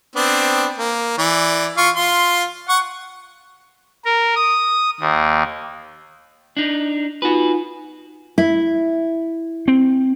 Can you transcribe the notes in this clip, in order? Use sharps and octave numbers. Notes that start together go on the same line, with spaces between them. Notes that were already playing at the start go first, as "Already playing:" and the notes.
B3 C4 D4
A#3
E3 D5
F4 F5 C#6
F4 C6
F#5 C#6
A#4
D#6
D#2
D4 D#4
D#4 F4 F#4 B4 G#5
E4
C4